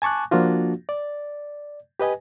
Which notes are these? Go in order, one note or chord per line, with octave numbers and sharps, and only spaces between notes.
G#5 A5 C#6 D6 F#6
F3 A#3 D4 F4 F#4
D5
G4 B4 D#5 G#5